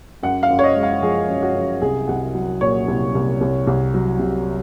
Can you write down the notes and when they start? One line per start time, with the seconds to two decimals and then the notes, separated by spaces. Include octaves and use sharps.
0.23 F#2 F#5
0.43 F5
0.50 F#2
0.59 C#5
0.64 D#5
0.76 G#3
0.83 F5
1.02 F3 G#4
1.28 F#2
1.43 F#4
1.55 F#2
1.82 C2 G#4
2.08 C2 F#5
2.34 F#3
2.61 A#2 C#5
2.88 C2
3.15 C2
3.41 C2
3.67 C2
3.94 F#3
4.19 C3